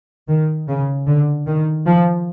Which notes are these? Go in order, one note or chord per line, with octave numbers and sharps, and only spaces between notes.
D#3
C#3
D3
D#3
F3